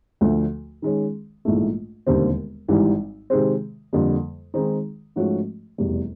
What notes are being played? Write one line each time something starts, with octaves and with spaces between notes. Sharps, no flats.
D2 D3 F3 A3
D#3 G#3 C#4
A#1 G#2 E3 A3
E1 D#2 D3 G3 C4
G#1 G#2 E3 G3
C3 D#3 G#3 C4
F2 D3 G3 A#3
D#3 G#3 C4 D#4
G#2 F3 A3 C#4 F#4
F1 E2 B2 G3